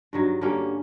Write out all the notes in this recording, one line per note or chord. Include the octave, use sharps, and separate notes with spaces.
G2 D#3 F#3
D3 G3 A#3 C#4